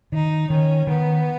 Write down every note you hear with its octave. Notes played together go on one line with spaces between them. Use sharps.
D#3 D#4
D#3 C#4
D#3 B3